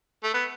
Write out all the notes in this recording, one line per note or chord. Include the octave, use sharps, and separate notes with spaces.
A3
B3